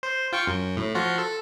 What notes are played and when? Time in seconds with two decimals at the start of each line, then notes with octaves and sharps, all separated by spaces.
0.03 C5
0.33 F4 G5 C#6
0.47 F#2
0.77 A2
0.95 F3 F4 F#4
1.18 A4